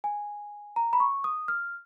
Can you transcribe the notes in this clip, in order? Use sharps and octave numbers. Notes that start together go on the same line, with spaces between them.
G#5
A#5
B5
C#6
D#6
F6